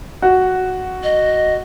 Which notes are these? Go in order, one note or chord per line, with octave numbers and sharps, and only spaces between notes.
F#4
D#5